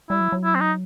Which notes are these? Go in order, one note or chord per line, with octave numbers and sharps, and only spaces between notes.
G3 E4
F#3
F#3
E4
C4
D#4